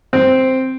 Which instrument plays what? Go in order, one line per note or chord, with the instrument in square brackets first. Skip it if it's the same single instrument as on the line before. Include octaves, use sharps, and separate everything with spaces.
[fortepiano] C4